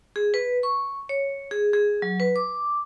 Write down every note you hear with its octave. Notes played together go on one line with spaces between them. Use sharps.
G#4
B4
C#6
C#5
G#4
G#4
F#3
B4
D6